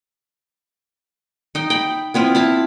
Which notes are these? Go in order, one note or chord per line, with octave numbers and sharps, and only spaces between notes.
D#4 G5
G5 B5
B3 C4 E4 F4
E4 F5 A5